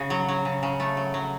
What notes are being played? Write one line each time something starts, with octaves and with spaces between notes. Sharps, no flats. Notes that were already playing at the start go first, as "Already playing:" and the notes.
Already playing: C#3 F#4 G#4
F#3
F#3
C#3
C#3
A3
F#3
F#3